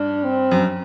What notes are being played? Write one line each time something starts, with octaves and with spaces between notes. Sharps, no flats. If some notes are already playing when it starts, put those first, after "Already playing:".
Already playing: G2 D4
C4
F#2